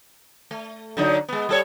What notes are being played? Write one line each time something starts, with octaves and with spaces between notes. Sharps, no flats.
A3
D3 F#3 D#4
G#3 B3
G3 A4 C#5